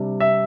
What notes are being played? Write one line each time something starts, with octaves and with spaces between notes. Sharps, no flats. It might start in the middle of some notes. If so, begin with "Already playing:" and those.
Already playing: C3 G3 D4
E5